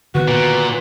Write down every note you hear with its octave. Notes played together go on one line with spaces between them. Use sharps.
D3 D#3 B3 F#4 B4
A#2